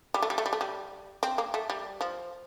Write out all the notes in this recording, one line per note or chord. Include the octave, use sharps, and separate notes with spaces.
G3
A3
G3
A3
G3
A3
G3
C4
A#3
A3
G3
F3